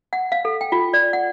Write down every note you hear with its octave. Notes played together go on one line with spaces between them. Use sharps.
F#5
F5
A4
G5
F4
D5
F#5